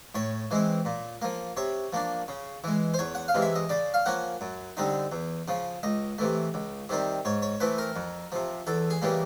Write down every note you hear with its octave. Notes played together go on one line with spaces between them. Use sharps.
A2 C#5
E3 G#3 C4
A#2
F3 A#3
C3 C#5
F3 A#3 D4
C#3
E3 G#3
C5
E2 C#5
F#5
F5
C3 E3 G#3
E5
D#5
C#3 D5
F5
F3 A#3 C#4 F#5
F#2
D3 G3 C4 D#4
E2
C#3 F3
C#2 D#5
C3 E3 A3
C#2
C3 D#3 G3 C4
G#2 C#5
C#5
E3 A3 C4 B4
A#4
F2
C3 F3
E2 A4
G#4
C#3 E3 G3 A#3